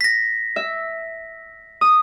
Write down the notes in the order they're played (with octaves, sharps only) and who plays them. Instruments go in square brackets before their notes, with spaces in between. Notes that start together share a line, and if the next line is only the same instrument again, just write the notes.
[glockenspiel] A#6 B6
[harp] E5
D#6